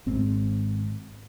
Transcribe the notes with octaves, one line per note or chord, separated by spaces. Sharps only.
G#1 G#2 C4